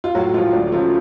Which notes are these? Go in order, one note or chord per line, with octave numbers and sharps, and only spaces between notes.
F4
A2 F#3 F#4
F3 G#3 F4
D2 D4
C#3 F3 F#3 A3 F4